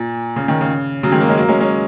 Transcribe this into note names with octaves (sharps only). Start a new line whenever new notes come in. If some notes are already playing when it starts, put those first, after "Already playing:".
Already playing: A#2
C#3
D#3
C#3
C#3 F#3
D#3 G#3
F#3 A#3
G#3 C#4
F#3 A#3
G#3 C#4
G#3 C#4